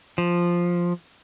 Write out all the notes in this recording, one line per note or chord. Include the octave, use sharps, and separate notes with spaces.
F3